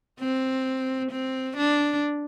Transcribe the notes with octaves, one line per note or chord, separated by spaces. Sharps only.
C4
C4
D4